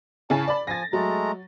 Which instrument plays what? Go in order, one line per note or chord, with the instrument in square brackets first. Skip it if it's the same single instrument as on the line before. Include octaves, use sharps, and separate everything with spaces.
[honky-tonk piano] C#3 E4 G#5 [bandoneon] A5
[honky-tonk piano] D5 B5
[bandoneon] F3 G#5 [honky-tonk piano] A6 A#6
[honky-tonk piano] F#3 [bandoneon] G#3 A3 A#5